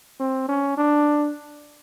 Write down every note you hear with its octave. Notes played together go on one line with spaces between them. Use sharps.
C4
C#4
D4